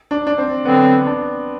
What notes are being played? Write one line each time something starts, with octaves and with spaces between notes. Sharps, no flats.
D4
D4
C4
D3 F#3 B3 C4
D4